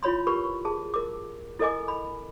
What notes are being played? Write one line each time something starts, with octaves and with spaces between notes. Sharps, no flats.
E4 F4 C#5 B5 C6
G4 A#4 B4 B5 C#6
G#4 A5
A#4 D6
E4 A4 A#4 D#5 G#5 D6
B5